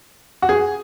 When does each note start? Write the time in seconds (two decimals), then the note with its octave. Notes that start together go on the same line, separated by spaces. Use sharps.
0.42 F#4
0.49 G#4